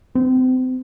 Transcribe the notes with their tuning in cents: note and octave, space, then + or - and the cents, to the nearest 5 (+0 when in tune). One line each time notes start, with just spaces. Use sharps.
C4 -35